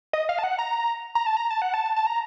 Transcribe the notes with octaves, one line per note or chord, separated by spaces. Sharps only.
D#5
F5
A5
F#5
A#5
A#5
A5
A#5
A5
F#5
A5
A5
A#5